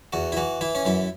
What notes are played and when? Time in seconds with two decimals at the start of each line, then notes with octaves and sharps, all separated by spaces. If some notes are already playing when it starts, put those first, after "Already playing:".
0.13 E2 F#4
0.32 E4
0.37 E3 F#4
0.61 E3 E4
0.75 C#4
0.85 F#2 E4